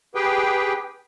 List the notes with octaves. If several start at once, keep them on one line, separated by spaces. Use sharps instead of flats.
G4 G#4 B4 G5